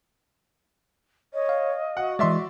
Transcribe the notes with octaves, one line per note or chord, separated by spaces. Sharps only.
C#5 D#5
F5
F#4 F#5
E3 G#3 D5 E5 C6